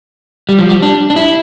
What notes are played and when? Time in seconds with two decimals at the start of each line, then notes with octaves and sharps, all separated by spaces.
0.49 G3
0.59 F3
0.69 G3
0.82 D4
1.10 D4
1.16 E4